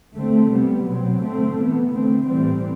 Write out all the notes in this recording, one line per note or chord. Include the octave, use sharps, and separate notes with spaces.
D3 A3 C4
C3 G3 B3
B2 F#3 C4
D3 A3 C4
E3 B3
D3 A3 C4
A2 E3 G3 C4